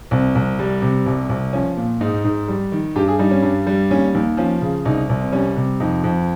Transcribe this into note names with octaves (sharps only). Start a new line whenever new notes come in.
C2 C4
C2
G3
C3
C2
C2
F3 C#4
A#2
G#2 D#4
G#2
G3
D#3
G2 G4
G#4
G3 D#4
C#4
G2
G3
D#2 C#4
D#2
F3 C#4
C#3
C2 D#4
C2
C4
G3 C#4
C3
F2 D#4
F2